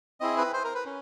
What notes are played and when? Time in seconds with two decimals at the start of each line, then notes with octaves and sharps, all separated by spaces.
0.20 C4 E4 G#4 D#5
0.37 B4
0.53 C5
0.64 A#4
0.75 B4
0.85 C#4